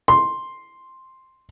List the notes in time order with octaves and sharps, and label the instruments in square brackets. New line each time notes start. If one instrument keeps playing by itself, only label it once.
[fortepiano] C6